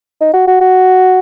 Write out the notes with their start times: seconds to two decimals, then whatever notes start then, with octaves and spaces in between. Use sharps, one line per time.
0.21 D#4
0.34 F#4
0.48 F#4
0.61 F#4